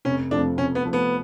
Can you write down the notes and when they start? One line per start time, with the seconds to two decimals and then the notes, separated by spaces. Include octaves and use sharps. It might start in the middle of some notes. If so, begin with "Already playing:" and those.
0.05 F1 C#4
0.31 F2 F3 A3 D4
0.57 F1 C#4
0.75 B3
0.84 F2 F3 A3
0.93 B3